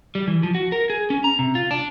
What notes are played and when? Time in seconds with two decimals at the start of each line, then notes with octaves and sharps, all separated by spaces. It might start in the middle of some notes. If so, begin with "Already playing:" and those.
0.15 G3
0.27 E3
0.43 F3
0.55 F#4
0.72 A#4
0.90 G#4
1.10 C#4
1.24 A#5
1.39 C3
1.55 F4
1.71 D4